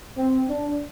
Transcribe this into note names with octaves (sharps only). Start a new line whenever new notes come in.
C4
D4